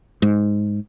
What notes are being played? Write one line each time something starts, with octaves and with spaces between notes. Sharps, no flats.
G#2